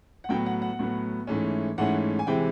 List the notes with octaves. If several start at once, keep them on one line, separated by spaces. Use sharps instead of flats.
F#5
A2 F#3 B3 G5
F#5
F#5
A2 F#3 B3
G#2 E3 A3 C#4
G#2 E3 A3 C#4 F#5
G#5
C3 E3 G#3 C4 G5